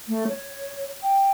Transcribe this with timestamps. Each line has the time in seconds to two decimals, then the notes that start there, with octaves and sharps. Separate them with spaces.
0.08 A3
0.28 C#5
1.03 G5